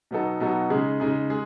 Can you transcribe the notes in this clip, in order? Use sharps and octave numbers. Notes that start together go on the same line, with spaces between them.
B2 F#3 B3 D#4 A4
B2 F#3 B3 D#4 A4
C#3 G#3 D#4 G#4
C#3 G#3 D#4 G#4
G#3 G#4